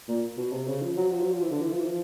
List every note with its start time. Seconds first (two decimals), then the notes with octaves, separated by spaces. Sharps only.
0.08 A#2
0.37 B2
0.53 C3
0.67 C#3
0.82 F3
0.97 F#3
1.12 F3
1.22 F#3
1.32 F3
1.42 E3
1.51 D3
1.62 E3
1.71 F3
1.79 E3
1.86 F3